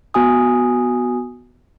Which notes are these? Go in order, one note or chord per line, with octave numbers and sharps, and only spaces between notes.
B3 F#4 G#5 D#6